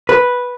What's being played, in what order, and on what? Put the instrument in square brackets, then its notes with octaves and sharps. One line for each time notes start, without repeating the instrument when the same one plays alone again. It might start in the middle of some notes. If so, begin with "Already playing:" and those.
[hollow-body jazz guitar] B4